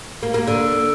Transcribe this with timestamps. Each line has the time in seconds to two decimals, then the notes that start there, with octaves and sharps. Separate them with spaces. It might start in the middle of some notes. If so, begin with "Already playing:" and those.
0.23 A#3
0.34 A#3
0.47 D3